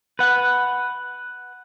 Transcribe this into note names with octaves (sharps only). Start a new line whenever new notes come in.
B4 F#5